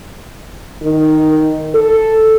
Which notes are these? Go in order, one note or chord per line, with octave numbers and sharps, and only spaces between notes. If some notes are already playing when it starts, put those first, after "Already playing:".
D#3
A4